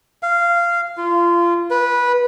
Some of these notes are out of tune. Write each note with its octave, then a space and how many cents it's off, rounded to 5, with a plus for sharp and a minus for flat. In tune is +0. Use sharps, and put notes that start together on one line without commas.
F5 -15
F4 -25
B4 -15